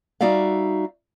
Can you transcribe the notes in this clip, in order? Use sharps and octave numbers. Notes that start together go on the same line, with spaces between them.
G3 D#4 F#4 D5 E5 F5